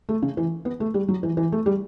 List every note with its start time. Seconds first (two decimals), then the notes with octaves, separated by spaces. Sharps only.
0.09 A3
0.22 C#3
0.37 E3
0.65 B3
0.80 A3
0.94 G3
1.08 F#3
1.23 E3
1.37 E3
1.52 A3
1.66 G3